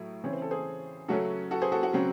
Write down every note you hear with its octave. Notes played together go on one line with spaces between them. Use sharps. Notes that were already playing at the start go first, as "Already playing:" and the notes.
Already playing: A2 F#3 E4
C#3 E3 C4 C#5
C5
A4
G#4 C5
C#3 F#3 A3 C#4 F#4 A4
F#4 A4
G#4 C5
F#4 A4
F#4
C#3 F#3 C4